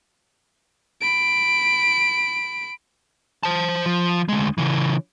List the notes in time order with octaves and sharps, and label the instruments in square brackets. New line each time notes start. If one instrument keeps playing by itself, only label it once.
[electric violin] B5 D7
[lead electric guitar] C5 A5
F3
D2 G#3
C#3 E3